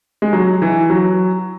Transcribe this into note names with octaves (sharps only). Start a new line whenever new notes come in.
G#3
F#3
E3
F#3